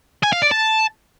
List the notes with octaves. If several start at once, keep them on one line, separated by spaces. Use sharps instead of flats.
G#5
F5
D5
A5